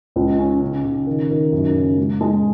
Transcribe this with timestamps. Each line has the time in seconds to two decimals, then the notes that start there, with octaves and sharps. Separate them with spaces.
0.16 C#2
0.38 C#4
0.62 C#3
0.84 C#3
1.07 D#3
1.30 D#3
1.52 F#2
1.75 C#3
1.98 G#3
2.21 G#3